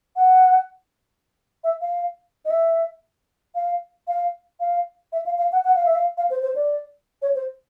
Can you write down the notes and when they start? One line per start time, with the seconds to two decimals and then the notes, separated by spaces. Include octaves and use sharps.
0.16 F#5
1.64 E5
1.81 F5
2.45 D#5
2.50 E5
3.55 F5
4.08 F5
4.60 F5
5.12 E5
5.26 F5
5.38 F5
5.52 F#5
5.65 F#5
5.75 F5
5.85 E5
5.95 F5
6.17 F5
6.30 C5
6.42 C5
6.56 D5
7.22 C#5
7.35 C5